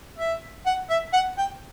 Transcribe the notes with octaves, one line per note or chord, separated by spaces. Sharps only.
E5
F#5
E5
F#5
G5